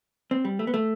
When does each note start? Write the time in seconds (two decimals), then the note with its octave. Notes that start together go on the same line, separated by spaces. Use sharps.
0.31 C4
0.45 G3
0.59 A3
0.67 B3
0.74 A3